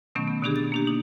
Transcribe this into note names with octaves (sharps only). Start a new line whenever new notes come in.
B2 D#3 F#3 A3 B3 C#4
B3
B2 D3 B3 D4 G4 G#4
A6
A#3 D4 G4
D#4